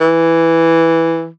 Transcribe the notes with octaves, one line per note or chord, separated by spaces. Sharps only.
E3